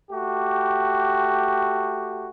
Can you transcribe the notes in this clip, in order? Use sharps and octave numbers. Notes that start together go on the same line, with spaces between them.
A3 F#4 G4